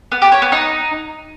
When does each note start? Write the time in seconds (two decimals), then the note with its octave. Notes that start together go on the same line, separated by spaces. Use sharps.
0.12 B3
0.22 G4
0.32 C#5
0.42 B3
0.52 D#4